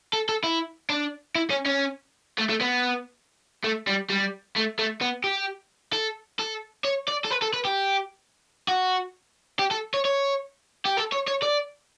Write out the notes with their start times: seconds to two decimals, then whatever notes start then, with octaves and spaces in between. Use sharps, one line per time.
0.13 A4
0.29 A4
0.44 E4
0.89 D4
1.35 E4
1.50 C#4
1.66 C#4
2.38 A3
2.50 A3
2.61 B3
3.64 A3
3.87 G3
4.10 G3
4.56 A3
4.79 A3
5.02 B3
5.24 G4
5.93 A4
6.39 A4
6.84 C#5
7.08 D5
7.24 A4
7.30 B4
7.42 A4
7.54 B4
7.65 G4
8.68 F#4
9.59 G4
9.71 A4
9.94 C#5
10.05 C#5
10.85 G4
10.97 A4
11.12 C#5
11.27 C#5
11.42 D5